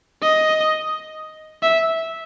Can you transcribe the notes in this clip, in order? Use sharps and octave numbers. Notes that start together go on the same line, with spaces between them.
D#5
E5